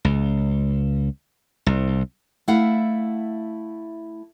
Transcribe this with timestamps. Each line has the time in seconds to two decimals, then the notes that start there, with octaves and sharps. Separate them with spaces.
0.05 C#2
1.66 C2
2.48 A3 E4 F5 F#5